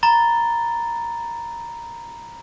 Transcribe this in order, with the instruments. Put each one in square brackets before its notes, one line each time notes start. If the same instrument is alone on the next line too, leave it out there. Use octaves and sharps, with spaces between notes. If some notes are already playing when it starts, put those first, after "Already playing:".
[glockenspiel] A#5 B5 A6 G7